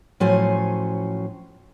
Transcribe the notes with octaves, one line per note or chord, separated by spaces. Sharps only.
A2 F3 F#3 C#4 C5 G#5